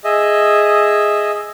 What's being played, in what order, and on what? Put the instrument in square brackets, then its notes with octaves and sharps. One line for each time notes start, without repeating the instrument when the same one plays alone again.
[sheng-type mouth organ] G#4 D#5 E5